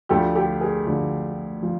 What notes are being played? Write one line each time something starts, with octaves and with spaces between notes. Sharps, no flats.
D2 D3 F3 G4 A4
G4 A4
G#4 A#4
D2 D3 F3
F3